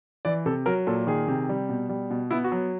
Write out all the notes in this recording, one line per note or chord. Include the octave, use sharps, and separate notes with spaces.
E3 D5
C3 A4
F#3 A#4
A#2 A4
D#3 G#4
C3
G3
B2
G3
B2
B3 E4
F#4
F#3